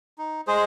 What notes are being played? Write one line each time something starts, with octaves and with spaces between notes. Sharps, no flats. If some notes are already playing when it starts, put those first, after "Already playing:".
D#4
G#3 G#4 C5